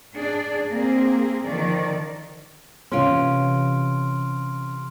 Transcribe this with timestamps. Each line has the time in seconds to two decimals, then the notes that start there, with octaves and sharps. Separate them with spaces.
0.15 D4 G#4 D5
0.71 A#3 C4 G#4
1.47 D3 D#3 F3 D5
2.92 C3 E3 C#4 F4 C6 F6 D7